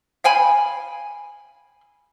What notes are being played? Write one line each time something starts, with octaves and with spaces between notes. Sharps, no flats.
F5 G5 G#5 B5